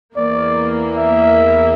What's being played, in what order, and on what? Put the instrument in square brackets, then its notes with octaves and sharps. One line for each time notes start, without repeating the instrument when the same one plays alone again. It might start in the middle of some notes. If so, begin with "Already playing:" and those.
[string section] E2 E3 A#3 [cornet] D5
[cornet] E5